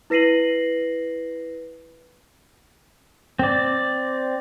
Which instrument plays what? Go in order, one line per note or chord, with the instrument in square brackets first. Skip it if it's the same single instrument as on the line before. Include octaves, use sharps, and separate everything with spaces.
[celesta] E4 B4 A#6 C7 D#7 F#7
[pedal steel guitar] C4 D5